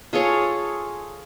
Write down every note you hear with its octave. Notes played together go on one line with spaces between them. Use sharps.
F4 G#4 A4 C#5